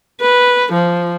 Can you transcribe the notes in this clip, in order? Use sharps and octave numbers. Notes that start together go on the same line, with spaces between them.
B4
F3